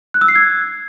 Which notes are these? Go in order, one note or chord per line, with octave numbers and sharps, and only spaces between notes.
F#6
E6
C7
G#6